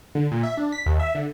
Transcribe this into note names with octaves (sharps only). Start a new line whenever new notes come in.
D3
A#2
E5
D4
B6
D#2
E5
D3